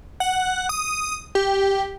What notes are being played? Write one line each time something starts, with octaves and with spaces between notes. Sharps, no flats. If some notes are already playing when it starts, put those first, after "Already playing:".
F#5
D#6
G4